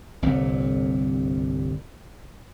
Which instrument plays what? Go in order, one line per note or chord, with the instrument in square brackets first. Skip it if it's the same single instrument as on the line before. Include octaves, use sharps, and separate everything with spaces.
[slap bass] G1 C2 A#2 C4